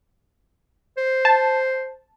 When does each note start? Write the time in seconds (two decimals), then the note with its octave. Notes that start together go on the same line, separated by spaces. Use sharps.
0.97 C5
1.25 A5